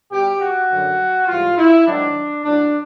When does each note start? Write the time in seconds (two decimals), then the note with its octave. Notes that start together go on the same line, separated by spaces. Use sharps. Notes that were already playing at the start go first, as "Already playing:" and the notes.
0.11 B2 G3 G4
0.41 F#4
0.70 F#2 D3 F#3
1.27 G#2 E3 G3 F4
1.58 E4
1.86 G#2 D#3 F#3 D4
2.45 A2 F#3 D4